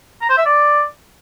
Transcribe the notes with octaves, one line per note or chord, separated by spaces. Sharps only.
A#5
C5
E5
D5